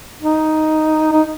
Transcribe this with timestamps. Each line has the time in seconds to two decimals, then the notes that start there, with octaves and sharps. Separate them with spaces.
0.22 D#4
1.12 D#4